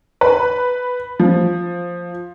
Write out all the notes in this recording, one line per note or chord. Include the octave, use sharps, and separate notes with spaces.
B4
F3